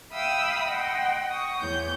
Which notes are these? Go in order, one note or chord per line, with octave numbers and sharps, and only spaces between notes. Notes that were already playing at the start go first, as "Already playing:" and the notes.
E5 F5 G5 B5 D#6 E6
D#5 F#5 G5 C6
C#6 D#6
E2 E3 C#5 G6